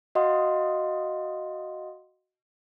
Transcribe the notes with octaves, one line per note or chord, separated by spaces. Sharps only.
F#4 D#5 F5 F#5 C6 D#6